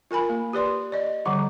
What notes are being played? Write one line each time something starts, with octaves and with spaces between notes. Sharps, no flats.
F4 A#4 G#5 B5
A#3
G4 B4 D5 C6
D5 D#5
D3 F3 G3 F#5